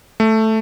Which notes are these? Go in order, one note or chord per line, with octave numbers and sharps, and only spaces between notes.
A3